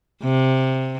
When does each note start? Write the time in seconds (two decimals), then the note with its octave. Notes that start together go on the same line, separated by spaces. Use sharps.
0.24 C3